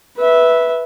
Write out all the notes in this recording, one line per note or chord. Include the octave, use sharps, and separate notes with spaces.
B4 E5